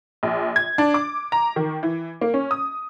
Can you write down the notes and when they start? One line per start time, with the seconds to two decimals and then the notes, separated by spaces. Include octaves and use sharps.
0.23 A#1
0.56 G#6
0.78 D4
0.94 D6
1.32 A#5
1.56 D#3
1.83 E3
2.21 A#3
2.34 C#4
2.51 D#6